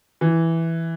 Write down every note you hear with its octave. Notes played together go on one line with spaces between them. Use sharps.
E3